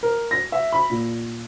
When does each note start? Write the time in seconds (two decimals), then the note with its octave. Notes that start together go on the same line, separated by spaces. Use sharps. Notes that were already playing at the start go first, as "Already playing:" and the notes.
0.03 A#4
0.31 A#6
0.52 E5
0.72 B5
0.90 A#2